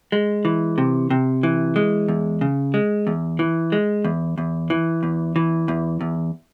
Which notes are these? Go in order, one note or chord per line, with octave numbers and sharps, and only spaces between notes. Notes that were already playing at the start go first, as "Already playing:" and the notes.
G#3
E3
C3
C3
E3
G#3
E2
C#3
G#3
E2
E3
G#3
E2
E2
E3
E2
E3
E2
E2